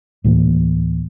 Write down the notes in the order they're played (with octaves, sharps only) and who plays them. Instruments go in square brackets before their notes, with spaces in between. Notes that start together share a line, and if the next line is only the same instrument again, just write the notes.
[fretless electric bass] D2 A2 E3 A#3